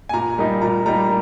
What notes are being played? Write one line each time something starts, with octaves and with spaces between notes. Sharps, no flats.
G#5
A#2 A#5
G3 A#3 D#4
A#2 A#5
G3 A#3 D#4 A#5